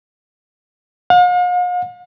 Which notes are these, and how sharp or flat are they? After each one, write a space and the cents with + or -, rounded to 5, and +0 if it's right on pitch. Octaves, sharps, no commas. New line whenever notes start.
F5 +45